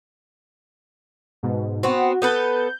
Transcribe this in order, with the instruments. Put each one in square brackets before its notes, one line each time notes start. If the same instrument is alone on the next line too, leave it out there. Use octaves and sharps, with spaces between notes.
[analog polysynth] G#2 B2
[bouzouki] B3 C4 [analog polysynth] F#4
[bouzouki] B3 A4 B4 [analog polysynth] G6